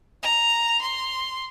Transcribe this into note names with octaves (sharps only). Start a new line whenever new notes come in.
A#5
C6